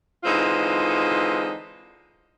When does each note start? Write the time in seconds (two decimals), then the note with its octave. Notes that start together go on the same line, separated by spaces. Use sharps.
0.24 D3 E3 G#3 C4 D#4 F4